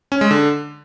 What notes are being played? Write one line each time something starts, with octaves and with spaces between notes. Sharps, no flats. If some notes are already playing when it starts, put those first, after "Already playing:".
C#4
G#3
D3